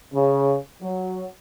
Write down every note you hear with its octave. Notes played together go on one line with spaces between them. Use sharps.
C#3
F#3